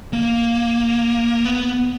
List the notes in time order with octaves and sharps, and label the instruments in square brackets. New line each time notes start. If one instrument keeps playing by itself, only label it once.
[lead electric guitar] A#3
B3